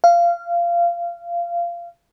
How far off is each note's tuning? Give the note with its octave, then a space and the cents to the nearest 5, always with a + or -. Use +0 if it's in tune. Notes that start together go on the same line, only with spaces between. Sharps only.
F5 -20